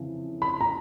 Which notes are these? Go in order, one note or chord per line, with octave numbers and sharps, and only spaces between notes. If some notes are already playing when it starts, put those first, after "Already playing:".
Already playing: F2 C#3 E3
B5
A#5